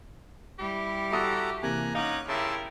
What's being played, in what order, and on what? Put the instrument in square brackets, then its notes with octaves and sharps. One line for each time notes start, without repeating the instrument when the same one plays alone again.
[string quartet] G3 E4 [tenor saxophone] G4
[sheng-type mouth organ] F#4 A4 A#5 [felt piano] E5 D#6 E6
[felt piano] C3 E3 A#3 [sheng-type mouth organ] G#5 A#5 F#6
[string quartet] C#4 F#5 F#6 [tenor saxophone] D#4 [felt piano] F5 [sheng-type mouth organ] D6
[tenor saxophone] C#3 [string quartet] E4 G4 A#4 [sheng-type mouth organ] E5 A5 C6